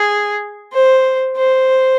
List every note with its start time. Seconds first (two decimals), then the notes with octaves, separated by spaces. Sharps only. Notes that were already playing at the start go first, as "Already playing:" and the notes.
Already playing: G#4
0.73 C5
1.37 C5